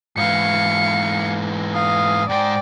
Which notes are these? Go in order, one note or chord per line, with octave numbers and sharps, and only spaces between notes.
G#2 E3 F5 C#7
F5 D#6
G#2 C5 D5 G5